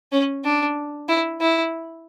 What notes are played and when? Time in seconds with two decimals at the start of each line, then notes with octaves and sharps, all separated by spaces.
0.12 C#4
0.44 D4
1.09 E4
1.41 E4